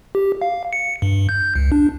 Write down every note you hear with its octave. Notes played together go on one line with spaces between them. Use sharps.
G4
F5
C#7
G2
G6
C#2
D4